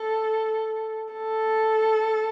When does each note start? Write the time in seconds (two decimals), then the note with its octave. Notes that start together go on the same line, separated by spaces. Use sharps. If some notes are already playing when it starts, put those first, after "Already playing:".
Already playing: A4
1.13 A4